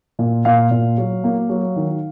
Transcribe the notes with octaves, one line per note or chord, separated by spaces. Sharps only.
A#2
A#2 F5
A#2
F#3
A#3
F#3
D#3